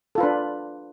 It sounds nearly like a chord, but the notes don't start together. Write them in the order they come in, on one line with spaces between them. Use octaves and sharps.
A4 F4 B4 D4